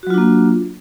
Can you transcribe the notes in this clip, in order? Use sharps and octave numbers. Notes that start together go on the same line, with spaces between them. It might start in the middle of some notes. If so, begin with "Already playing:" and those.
F#3 A#3 D4 F4 F#4